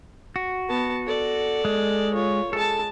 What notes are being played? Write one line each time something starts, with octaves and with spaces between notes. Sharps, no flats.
F#4
B3 A5
A4 D5
G#3
F4 C#5
G#3 A4 A5